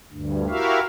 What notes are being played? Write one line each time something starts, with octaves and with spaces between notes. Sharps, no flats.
D2 G2
E4 F#4 G4 A#4 E5 F5